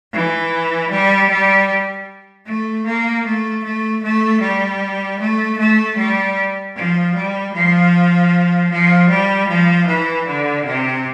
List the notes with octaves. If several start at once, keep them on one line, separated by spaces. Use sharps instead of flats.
E3
G3
G3
A3
A#3
A3
A3
A3
G3
A3
A3
G3
F3
G3
F3
F3
G3
F3
E3
D3
C3